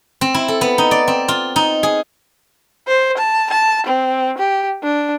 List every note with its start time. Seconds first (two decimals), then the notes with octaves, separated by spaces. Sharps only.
0.21 C4
0.34 E4
0.48 A4
0.61 B3
0.78 D#4
0.91 D5
1.08 C4
1.28 F4
1.56 D#4
1.83 G#4
2.87 C5
3.17 A5
3.50 A5
3.86 C4
4.38 G4
4.83 D4